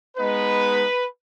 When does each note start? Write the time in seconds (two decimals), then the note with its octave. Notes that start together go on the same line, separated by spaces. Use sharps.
0.17 G#3 B3 D#4 B4